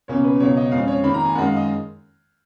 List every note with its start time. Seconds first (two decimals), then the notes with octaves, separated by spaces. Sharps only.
0.08 C#2 B2 A#3 C#4 C#5
0.24 B4
0.40 C#2 B2 F#3 C#5
0.57 D#5
0.72 F2 F3 G#3 C#4 F5
0.88 C#5
1.04 F2 D#3 A#3 B5
1.14 A#5
1.25 G#5
1.35 F#2 D#3 G#3 F#5
1.46 F5
1.56 D#5